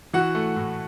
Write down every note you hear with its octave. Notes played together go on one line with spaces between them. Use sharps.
E3 F#4 F#5
A3
A2